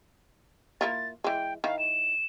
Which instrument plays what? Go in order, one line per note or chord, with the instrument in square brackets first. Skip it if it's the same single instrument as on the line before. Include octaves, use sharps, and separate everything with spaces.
[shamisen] A#3 E4 F4 [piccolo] A6
[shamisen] E3 G#3 [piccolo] G5
[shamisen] D#3 E4 [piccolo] F5
[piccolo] E7